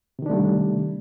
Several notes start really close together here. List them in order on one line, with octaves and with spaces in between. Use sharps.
C3 D#3 D4 A3 G3